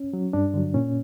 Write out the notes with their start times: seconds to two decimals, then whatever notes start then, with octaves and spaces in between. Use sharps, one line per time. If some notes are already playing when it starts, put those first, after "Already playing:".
Already playing: C#4
0.13 F#3
0.33 G2 D4
0.54 D3 F#3
0.74 A#2 C#4